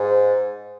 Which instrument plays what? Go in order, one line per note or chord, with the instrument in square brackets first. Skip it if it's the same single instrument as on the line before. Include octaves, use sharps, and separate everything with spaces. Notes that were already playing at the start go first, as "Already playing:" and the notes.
Already playing: [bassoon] G#2